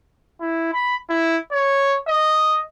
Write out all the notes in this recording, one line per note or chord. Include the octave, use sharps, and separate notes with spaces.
E4
B5
E4
C#5
D#5